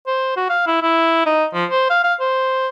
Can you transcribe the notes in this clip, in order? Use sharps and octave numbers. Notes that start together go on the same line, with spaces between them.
C5
F#4
F5
E4
E4
D#4
F3
C5
F5
F5
C5